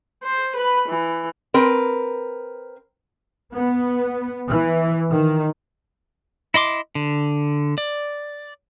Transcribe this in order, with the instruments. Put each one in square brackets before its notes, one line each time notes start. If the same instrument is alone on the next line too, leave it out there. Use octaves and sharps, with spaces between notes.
[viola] C5
B4 B5
E3
[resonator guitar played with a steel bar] C4 A#4 B4
[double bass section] B3
E3
D#3
[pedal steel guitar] E4 D#5 C6 D6
D3
D5